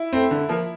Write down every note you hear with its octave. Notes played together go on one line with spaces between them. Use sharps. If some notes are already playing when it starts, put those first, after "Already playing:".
Already playing: E4
A3 C4
D3
F3 A#3